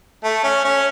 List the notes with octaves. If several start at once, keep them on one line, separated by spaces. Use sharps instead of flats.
A3
C#4
C#4